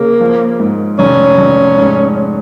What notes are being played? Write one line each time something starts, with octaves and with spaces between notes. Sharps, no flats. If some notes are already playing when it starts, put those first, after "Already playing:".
Already playing: C#3 A#3
F3
G#2
F1 C#4
F1
G#2